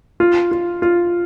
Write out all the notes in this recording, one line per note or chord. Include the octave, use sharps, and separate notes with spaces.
F4
F4
F4